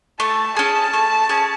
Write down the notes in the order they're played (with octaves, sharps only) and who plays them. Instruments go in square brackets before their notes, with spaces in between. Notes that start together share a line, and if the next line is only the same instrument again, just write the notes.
[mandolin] A3 [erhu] A5
[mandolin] C#4 G#4 [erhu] A5
[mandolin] A3
C#4 G#4